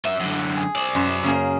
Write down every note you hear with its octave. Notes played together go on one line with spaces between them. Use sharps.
F#2 E5
F#2 D3
G#4
C5 D5
F#2 C6
C#3 A#3 G#4